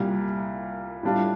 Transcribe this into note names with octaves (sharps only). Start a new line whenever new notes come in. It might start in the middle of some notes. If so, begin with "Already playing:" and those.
Already playing: C2 A#2 G3
A2 G3 D4 F4